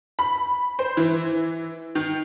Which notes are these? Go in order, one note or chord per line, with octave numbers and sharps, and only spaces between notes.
B5
C5
E3
D#3